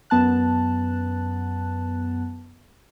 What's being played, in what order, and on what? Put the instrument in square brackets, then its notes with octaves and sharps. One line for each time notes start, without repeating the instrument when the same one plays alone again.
[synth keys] F#2 B3 A5 F#6